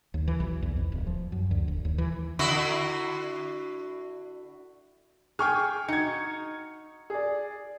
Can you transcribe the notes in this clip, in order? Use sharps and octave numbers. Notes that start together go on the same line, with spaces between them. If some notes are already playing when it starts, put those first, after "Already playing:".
D#2
E3
B1
E2
F2
D1
F3
F#2
D2
E1
D#2
E3
D3 E4 F#4
G#4 G5 C#6 F6
D#4 F#4 G#6 C#7
G#4 D5